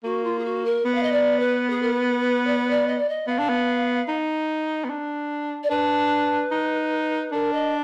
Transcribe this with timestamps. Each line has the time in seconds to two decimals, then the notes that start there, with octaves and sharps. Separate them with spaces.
0.03 A#3 F#4
0.24 F4
0.38 G#4
0.44 F#4
0.65 A#4
0.85 B3 B4
0.94 F5
1.02 D#5
1.12 D5
1.39 B4
1.70 G#4
1.81 A#4
1.92 B4
2.20 B4
2.46 D5
2.58 B4
2.70 D5
2.87 D#5
2.98 D5
3.09 D#5
3.27 B3 F5
3.39 D4
3.49 B3
4.08 D#4
4.84 B3
4.90 D4
5.63 D5
5.70 D4 B4
6.51 D#4
7.32 D4 A#4
7.52 D#5